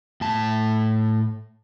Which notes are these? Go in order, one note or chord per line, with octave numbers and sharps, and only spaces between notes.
A2 A5